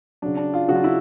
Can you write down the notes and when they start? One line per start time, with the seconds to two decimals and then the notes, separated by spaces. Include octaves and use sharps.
0.22 C#3 F#3 D4
0.37 D4
0.54 F4
0.69 C#3 F#4
0.71 F#3 F4
0.84 E4